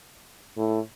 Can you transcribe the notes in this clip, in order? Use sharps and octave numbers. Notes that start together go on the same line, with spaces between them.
A2